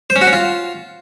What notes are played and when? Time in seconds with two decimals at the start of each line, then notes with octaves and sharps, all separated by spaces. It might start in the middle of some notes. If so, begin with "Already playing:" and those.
0.10 C5
0.16 C#4
0.21 F#4
0.27 C#4
0.33 F4